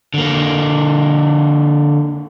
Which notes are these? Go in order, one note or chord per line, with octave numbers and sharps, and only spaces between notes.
D3 A#3